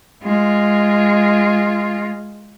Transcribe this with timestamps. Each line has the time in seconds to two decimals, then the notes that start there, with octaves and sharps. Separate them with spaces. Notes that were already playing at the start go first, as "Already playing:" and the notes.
0.23 G#3 F4